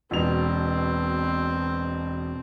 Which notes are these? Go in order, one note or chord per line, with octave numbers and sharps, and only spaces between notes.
E1 B2 C4 F7